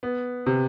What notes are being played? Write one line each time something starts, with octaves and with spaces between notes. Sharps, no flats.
B3
C3